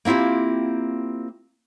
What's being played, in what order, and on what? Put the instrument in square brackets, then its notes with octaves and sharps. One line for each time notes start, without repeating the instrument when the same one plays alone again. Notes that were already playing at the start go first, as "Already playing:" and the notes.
[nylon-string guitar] A#3 C4 E4 F4 G4